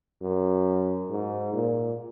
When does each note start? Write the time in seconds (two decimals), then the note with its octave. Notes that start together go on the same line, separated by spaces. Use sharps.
0.21 F#2
1.10 G#2
1.53 A#2